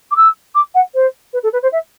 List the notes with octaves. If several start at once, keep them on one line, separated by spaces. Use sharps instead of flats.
D6
E6
D6
F#5
C5
B4
A4
B4
C5
E5